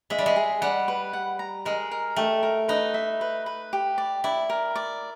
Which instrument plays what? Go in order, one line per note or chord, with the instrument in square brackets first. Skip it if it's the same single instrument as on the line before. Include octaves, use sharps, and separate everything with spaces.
[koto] G#3 [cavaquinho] E5
[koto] G3
G#3
[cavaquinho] G#4
[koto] G3 [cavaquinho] F#5
[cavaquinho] B4
F#5
A#5
[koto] G#3 [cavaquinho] A#4
[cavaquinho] A#4
[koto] A3 [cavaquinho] G4
[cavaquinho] A#4
[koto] D#4 [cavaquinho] B4
[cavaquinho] E5
B4
B4
G4
D5
[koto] E4 [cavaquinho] D5
[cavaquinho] A#4
D5